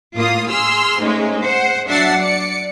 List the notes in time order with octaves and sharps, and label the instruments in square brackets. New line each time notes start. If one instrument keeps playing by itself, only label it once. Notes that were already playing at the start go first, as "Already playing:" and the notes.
[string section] A2 A#3 F4 D#6
G#4 C6 E6 F6
G#2 G#3 A3 C#4
C5 F#5
F#3 D4 E5 F#5 A6 C7
D5 C#7